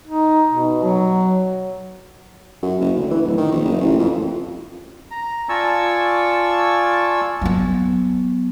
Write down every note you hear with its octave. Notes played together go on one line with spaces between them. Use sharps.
D#4
B2
F#3
F#2
F#1
D2
E3
D1
D#3
A#1
F#1
A1
F2
A#5
F4 D5 G#5 A5 C#6 E6
F#3 B3